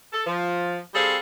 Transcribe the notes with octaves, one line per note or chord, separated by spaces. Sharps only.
A4
F3
G3 C4 G#4 A4 C5 F5